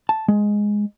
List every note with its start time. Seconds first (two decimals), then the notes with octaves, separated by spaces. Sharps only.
0.09 A5
0.28 G#3